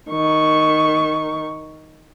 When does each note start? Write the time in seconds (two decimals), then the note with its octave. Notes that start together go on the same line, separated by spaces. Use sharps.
0.11 D#3 C#6